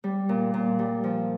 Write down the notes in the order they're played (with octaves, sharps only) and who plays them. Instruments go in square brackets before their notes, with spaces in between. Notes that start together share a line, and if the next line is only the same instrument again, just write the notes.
[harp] G3
A#2
A#2
G3
F3